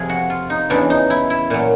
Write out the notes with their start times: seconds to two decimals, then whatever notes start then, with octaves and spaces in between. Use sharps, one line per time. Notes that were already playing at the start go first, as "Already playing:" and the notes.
Already playing: F2 C3 F3 G#4
0.09 F#4
0.30 F4
0.50 D#4
0.70 E2 C#3 E3 D4
0.90 D#4
1.10 E4
1.30 E4
1.50 A#2 F#3